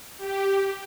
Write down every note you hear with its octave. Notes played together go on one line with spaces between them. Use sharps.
G4